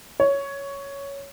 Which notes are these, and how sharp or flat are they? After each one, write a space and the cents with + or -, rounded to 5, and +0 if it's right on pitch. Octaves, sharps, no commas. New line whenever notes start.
C#5 +5